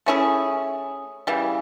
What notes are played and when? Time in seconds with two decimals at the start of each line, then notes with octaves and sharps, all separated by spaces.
0.06 A3 C#4 E4 G#4
1.27 C#3 E3 G3